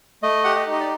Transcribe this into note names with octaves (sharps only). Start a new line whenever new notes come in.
A3 D#5
G4 F#5
D#5
D#4
D#5
D5